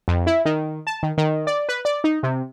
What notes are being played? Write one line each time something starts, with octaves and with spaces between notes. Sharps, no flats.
F2
E4
D#3
A5
D#3
D#3
D5
B4
D5
D#4
C3